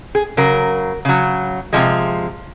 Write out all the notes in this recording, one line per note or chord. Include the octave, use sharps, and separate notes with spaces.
G#4
C#3 F#3 A#4
C#3 F#3
C3 F3 G#3